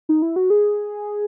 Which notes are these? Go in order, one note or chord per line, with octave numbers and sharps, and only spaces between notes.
D#4
E4
F#4
G#4